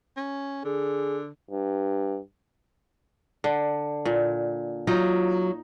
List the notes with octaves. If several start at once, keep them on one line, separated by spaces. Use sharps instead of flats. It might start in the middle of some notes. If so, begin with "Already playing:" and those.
C#4
D3 G#4
G2
D3
A#2
F#3 D#4 F4